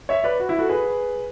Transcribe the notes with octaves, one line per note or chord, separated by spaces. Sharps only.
C#5 E5
B4 D5
F#4
E4
F#4 A4
G#4 B4